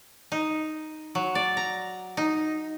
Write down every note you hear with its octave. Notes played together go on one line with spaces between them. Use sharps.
D#4
F#3
D5
A#5
D#4